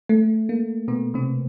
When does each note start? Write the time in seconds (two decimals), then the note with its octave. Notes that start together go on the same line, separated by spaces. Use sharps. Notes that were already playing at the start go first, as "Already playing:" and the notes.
0.09 A3
0.49 A#3
0.88 B2 B3
1.14 C3 C4